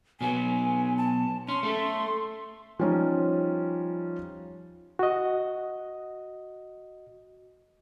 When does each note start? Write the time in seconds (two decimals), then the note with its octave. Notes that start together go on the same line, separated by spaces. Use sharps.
0.21 B2 F#3 B3 G#5
0.97 A5
1.48 C#4 C6
1.63 A3 A4
2.79 F3 G3 C#4 D#4 F4
4.99 F#4 D#5